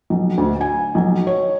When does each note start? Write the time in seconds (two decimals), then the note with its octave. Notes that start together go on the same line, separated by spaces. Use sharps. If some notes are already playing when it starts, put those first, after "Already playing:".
0.10 B1
0.38 D2
0.61 G#5
0.95 B1
1.27 C#5